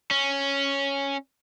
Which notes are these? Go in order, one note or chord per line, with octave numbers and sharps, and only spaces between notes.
C#4